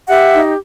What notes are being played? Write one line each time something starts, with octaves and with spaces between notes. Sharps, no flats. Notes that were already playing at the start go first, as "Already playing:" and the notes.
G4 E5 F#5
D#4